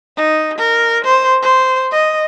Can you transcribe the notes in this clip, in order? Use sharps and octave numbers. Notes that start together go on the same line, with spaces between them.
D#4
A#4
C5
C5
D#5